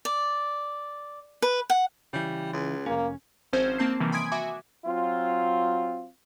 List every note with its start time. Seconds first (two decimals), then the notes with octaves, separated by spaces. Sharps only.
0.05 D5
1.42 B4
1.70 F#5
2.13 C#3 E3 G3
2.53 C#2
2.86 F1 A#3 C#4
3.53 G#1 F3 C4 C#4 C5 G#6
3.78 A#3 C4 A5 G6 C7
4.00 C3 D#3 E3 F#3 G3 A#3
4.12 G#5 B5 C6 D#6 G#6 D7
4.32 F#4 E5 G#5 D6
4.86 F#3 C4 F4